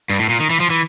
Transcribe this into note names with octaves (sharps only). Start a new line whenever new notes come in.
G2
A2
A#2
D#3
E3
F3
E3